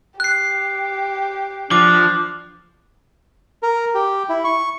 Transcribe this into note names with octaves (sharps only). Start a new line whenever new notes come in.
G4 F#6 C7
F3 D4 D6
A#4
G4
E4
C#6